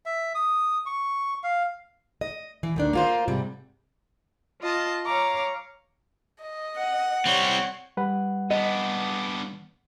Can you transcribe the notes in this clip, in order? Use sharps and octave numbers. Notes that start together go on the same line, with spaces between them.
E5
D#6
C#6
F5
D#5
E3
D2 D#3 D4
A#3 F4 C5
G#2 C3 G3
F4 D#5 A5
C#5 F5 A#5 D6
D#5
F#5
G3 C4 C#5
G3 B4 F#5
B3 D4 D#5